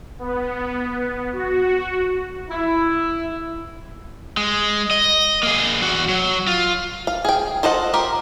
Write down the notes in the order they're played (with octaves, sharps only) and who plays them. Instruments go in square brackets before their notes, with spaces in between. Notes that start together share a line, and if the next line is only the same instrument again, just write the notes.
[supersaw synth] B3
F#4
[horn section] E4
[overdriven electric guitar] G#3
D#5
A#3 G#4
E2 F#4
F#3
F4
[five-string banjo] F5
G#4 G5
F4 A4 C5 D#5 F#5
F4 G4 A#4 C5